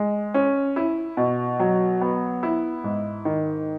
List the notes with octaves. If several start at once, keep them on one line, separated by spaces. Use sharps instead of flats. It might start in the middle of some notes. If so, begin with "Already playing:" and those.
Already playing: G#3
C#4
E4
B2
F#3
B3
E4
G#2
D#3